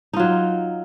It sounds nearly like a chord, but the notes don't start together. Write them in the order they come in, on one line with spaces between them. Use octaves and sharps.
D#4 F4 F#3